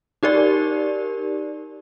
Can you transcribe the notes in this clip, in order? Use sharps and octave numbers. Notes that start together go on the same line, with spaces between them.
D#4 G4 A#4 D5